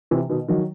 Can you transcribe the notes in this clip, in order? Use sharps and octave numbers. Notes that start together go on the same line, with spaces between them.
C3 E3
B2 D#3
D#3 F#3